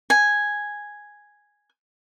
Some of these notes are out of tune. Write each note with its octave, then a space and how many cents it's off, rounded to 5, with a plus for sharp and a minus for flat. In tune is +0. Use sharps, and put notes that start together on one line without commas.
G#5 -5